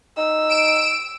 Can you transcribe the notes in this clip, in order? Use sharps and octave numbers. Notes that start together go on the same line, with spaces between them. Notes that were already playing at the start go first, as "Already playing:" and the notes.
D#4 E6
D7 E7